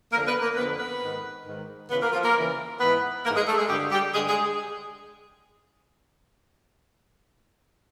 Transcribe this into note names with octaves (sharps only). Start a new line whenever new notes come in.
F2 D3 A#3 A#4
B3 B4
A#3 A#4
F2 D3 B3 B4
B3 B4
G#2 D#3
G#2 D#3
E2 C#3 E3 B3 B4
A#3 A#4
F3 F4
A#3 A#4
E2 C#3 E3
G#2 E3 B3 B4
G#2 E3 A#3 A#4
G#3 G#4
A3 A4
G#3 G#4
G2 D3 G3 G4
G3 G4
G2 D3 G#3 G#4
G#3 G#4